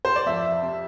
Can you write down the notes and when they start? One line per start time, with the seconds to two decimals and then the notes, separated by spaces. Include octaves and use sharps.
0.05 C5
0.16 D5
0.26 F2 E5
0.62 C3